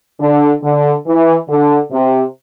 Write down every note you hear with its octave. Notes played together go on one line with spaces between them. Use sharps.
D3
D3
E3
D3
C3